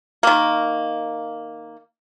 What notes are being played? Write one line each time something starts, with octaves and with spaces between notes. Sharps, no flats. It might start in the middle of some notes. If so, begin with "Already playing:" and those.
D#3 A#3